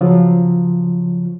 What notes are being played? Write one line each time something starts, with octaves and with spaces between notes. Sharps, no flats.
C#3 F3 F#3 F4